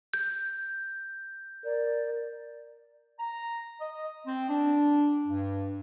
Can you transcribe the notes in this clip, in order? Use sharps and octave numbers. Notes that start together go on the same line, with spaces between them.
G6
A#4 D5
A#5
D#5
C4
D4
G2